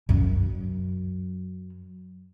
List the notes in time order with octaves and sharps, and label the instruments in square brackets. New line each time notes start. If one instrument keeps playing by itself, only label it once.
[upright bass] F#2 F#3